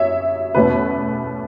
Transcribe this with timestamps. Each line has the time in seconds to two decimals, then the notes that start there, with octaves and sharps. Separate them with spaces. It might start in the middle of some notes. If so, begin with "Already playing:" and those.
Already playing: F#2 F#3 C#5 E5
0.55 E2 B2 A3 C#4 B4